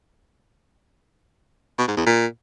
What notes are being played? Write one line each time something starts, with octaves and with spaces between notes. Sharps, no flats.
B2
G#2
E2
A#2